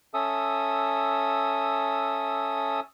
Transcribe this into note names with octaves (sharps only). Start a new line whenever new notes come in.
C#4 A4 E5 D#6